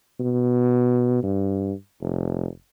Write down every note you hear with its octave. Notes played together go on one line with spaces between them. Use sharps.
B2
G2
F1